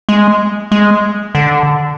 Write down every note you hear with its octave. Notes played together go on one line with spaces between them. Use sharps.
G#3
G#3
D3